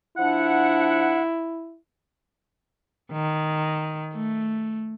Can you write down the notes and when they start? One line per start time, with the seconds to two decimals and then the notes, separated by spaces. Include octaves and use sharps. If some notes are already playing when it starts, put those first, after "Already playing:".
0.17 F3 D4 E4 F#5
3.12 D#3
4.14 A3